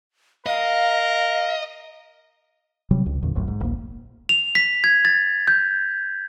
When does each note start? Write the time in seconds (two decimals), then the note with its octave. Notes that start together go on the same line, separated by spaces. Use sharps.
0.46 A#4 D#5 F5
2.91 C3 F#3 G3
3.06 C#2
3.23 E2 A#2 D3
3.35 D1 A#1 F#2 A2
3.48 G#2
3.60 D#1 A#1 A#3
4.29 F7
4.55 B6
4.84 G#6
5.05 A6
5.47 G6